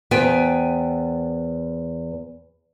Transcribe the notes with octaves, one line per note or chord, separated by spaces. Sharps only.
E2 B3 C5 G5 G#5